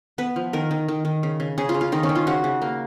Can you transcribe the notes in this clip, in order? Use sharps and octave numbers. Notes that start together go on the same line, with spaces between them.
B3 B4
F3
D#3 A#4
D#3
D#3
D#3
C#3
C#3
C#3 G#4
F4
C#3
F4
D#3 D#4
C#4
D#3
F4
C#3 F#4
C#3
A#3